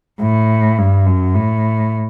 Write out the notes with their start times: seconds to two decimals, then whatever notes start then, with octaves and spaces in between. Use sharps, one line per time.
0.22 A2
0.78 G2
1.06 F#2
1.35 A2